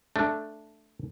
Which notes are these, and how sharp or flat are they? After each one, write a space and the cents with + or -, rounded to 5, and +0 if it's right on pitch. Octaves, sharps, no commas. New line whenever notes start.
A3 +0 D4 +0